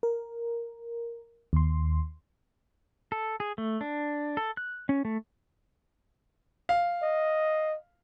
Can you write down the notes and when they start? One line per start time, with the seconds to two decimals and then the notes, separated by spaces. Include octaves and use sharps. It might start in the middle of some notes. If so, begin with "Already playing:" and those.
0.03 A#4
1.53 D#2 C6
3.12 A4
3.40 G#4
3.58 A3
3.81 D4
4.37 A4
4.57 F#6
4.89 C#4
5.05 A3
6.69 F5
7.03 D#5